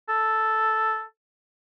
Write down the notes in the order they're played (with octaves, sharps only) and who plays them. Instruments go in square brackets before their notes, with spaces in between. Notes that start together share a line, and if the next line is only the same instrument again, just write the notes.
[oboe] A4